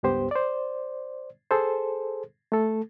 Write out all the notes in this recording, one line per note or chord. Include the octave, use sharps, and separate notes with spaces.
C#2 G2 B3 G4 C5
C5 D5
G#4 A4 C5
A3 A4